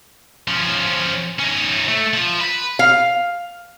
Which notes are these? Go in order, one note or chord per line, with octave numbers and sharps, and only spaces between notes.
F3 C#4
C#4 D#4
A3
F3
B4
F5